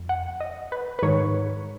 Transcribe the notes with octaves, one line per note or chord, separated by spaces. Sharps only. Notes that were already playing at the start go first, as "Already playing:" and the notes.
Already playing: F2
F#5
D#5
B4
B4
G#2 D#3 C#5